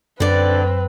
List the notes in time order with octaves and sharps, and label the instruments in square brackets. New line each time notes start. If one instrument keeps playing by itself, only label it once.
[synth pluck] F#2 [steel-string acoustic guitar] D3 D5 [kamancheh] C4 B4